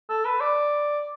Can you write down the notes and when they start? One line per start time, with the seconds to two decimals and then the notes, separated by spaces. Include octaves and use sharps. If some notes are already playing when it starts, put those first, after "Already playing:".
0.09 A4
0.25 B4
0.41 D5